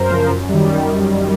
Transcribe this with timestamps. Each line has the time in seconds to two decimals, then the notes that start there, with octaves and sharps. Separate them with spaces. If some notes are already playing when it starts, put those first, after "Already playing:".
Already playing: F#2 A#4 C5
0.10 C#3 F3
0.30 F#2
0.49 D#3 G3